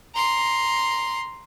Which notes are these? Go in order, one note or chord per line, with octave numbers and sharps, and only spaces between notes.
A#5 C6